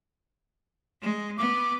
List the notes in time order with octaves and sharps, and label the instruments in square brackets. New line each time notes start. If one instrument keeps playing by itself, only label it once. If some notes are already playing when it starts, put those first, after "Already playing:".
[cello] G#3
[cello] B3 [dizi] D6